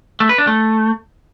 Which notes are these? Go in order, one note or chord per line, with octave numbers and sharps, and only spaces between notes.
A3
B4
D4
A3